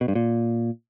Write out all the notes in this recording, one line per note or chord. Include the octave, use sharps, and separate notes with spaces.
B2
G2
A#2